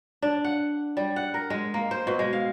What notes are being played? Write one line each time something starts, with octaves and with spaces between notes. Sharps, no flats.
D4
F#5
G3
F#5
A#4
G#3
A#3
C5
B2
G#3
F5